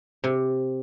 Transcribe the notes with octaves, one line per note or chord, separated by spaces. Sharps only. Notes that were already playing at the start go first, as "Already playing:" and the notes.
C3